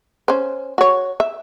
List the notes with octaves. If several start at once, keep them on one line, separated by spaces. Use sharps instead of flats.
C#4 C5
F#4 C#5
E5